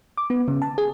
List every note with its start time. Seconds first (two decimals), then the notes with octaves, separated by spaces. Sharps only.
0.17 D6
0.30 B3
0.48 C#3
0.62 A5
0.78 G#4